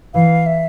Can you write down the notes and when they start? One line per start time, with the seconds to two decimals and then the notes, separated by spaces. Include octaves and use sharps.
0.14 E3 F5
0.46 E5